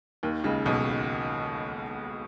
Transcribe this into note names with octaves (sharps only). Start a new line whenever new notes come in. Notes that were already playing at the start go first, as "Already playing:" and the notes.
D#2 D#3
C#2 C#3
B1 B2